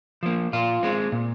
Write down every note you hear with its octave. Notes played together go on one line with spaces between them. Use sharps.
F3 A#3
A#2 F4
G#3 C4
A#2